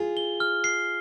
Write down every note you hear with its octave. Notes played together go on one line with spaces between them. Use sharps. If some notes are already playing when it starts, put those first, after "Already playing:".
Already playing: F4 G#4
G7
F6
C7